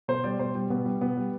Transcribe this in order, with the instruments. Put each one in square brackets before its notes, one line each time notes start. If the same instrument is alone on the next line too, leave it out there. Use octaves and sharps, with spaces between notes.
[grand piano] B2 C5
G3 D5
B2 C5
G3
B2 B3
G3
B2 B3
G3